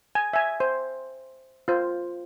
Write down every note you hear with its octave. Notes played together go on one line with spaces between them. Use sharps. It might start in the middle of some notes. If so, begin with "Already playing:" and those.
G#5
E5 G#5
C5
F4 C5